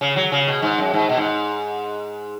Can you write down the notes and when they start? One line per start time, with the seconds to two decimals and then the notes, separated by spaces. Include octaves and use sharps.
0.01 C#3
0.16 F#3
0.32 C#3
0.47 B2
0.62 G#2
0.78 F#2
0.94 G#2
1.09 B2
1.17 G#2